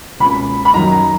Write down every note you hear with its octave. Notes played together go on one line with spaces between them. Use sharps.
C#2 B2 A#3 C#4 B5
B5
F#2 D#3 F#3 A#3 D#4 A#5
A#5